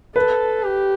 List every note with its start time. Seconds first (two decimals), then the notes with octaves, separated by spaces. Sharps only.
0.16 A4 B4
0.64 G4